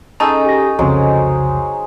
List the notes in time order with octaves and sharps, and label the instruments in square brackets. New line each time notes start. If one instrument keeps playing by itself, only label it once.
[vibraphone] C#4 A4 D#5 [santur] D#4 G#4 [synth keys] A5 E6
[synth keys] G4 A#6
[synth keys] C2 F2 C#3 [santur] F#3 G#3 C5